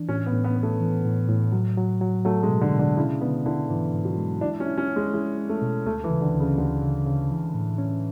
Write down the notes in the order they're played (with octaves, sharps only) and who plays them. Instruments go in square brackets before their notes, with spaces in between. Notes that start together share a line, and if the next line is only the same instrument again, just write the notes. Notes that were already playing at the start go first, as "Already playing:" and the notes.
Already playing: [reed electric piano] E3 D4
[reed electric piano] A2 [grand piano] C#4
[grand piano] B3
[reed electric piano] A2
[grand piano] B3
[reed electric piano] B3
[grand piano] A3
[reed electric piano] E3
A2
A2
F#3
F#3
F#3
[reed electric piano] F#3 [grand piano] A3
[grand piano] G#3
[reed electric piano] B2
[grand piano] D3
[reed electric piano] B2
[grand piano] D3
[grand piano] C#3 [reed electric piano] E4
[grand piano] D3 [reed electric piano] B3
[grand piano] D3 [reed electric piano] E4
[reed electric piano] G#2 [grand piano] E3
[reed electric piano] G#2
[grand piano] F#3
[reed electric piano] G#3
[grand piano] D4 [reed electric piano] E4
[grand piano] C#4
[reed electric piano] E4
[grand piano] C#4
[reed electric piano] C#4
[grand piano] G#3
[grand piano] G#3 [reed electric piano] E4
[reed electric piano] C#4
[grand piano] A3
[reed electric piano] B2
[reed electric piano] D2 [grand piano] A3
[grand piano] E3
[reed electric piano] C#3
[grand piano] D3
[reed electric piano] D2
[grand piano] C#3
[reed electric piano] D2 [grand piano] D3
[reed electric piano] C#3
C#3
E3
A2
C#4